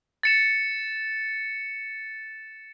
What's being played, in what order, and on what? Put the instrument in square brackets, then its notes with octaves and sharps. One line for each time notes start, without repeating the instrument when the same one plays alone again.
[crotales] A6 C#7 E7